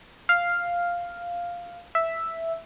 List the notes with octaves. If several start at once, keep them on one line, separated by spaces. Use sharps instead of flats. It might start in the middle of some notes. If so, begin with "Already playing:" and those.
F5
E5